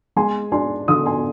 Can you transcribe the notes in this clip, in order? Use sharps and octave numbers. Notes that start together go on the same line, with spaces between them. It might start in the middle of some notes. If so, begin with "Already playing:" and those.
G#3 G#5 C6
D4 G#5 C6
D3 C6 D#6
G#5 C6